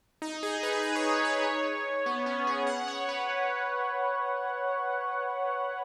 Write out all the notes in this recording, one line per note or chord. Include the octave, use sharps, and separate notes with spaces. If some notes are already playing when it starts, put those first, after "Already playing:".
D#4
G#4
B4
B4
C#5
B4
C#5
B3
C#4
G#4
F#5
C#5
B4